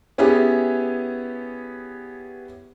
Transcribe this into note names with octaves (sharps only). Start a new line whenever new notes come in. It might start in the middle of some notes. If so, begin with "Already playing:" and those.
B3 C#4 E4 G4 G#4